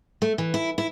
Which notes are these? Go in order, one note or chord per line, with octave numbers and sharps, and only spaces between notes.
A3
E3
E4
E4